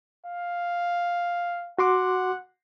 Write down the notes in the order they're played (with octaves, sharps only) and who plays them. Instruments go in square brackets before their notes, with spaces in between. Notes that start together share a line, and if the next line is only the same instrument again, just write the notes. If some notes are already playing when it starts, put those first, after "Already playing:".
[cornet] F5
[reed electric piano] F#4 C6 D6 [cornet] F#5